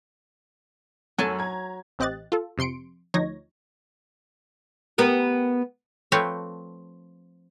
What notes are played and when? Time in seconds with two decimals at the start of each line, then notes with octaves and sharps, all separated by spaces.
1.19 F#2 F#3 A4 G#5 A5
1.39 A#5 G#6
1.99 A1 C4 G4 D#5 F#6 A6
2.32 F4 A4
2.58 F2 C3 C6 C#7 D7
3.14 D2 F3 D#4 C#5 G#6 A#6
4.98 B3 G4 A#4
6.12 F3 A3 C4 B4 C#5 G5